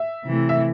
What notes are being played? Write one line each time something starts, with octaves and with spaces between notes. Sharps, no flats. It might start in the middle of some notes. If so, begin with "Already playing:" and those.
Already playing: E5
C3 E3 A3
E5